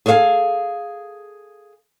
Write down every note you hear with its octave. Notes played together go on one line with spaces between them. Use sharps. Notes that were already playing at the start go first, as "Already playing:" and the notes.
G#4 A4 C#5 E5 F5 G#5